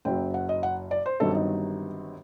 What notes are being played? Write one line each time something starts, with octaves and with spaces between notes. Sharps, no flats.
F#1 F#2 F#3 G5
F#5
D#5
F#5
D5
C5
G1 G2 D#3 F#3 C4 A4
D#4